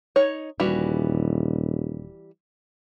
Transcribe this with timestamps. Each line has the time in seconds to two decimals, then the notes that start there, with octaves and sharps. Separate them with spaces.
0.16 D#4 C#5
0.60 D#1 E3 G3 F#4